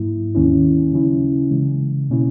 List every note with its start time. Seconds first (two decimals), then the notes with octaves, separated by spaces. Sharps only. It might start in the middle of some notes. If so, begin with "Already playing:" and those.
Already playing: G#2 F#3 A#3 E4
0.35 D#2 D#3 A#3 C#4 E4
0.92 C#3 F#3 C#4 E4
1.51 C#3 E3 G#3
2.10 B2 A#3 C#4 E4